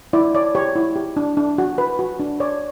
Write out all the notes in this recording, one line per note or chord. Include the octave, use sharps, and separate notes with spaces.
E4 D5
C#5 D5
G4 C#5
E4
G4
D4
D4
F#4
B4
F#4
D4
C#5 D5